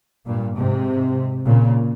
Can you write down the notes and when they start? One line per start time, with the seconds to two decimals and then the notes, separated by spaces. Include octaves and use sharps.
0.26 G2 A#2
0.56 G#2 C3
1.45 A#2 C#3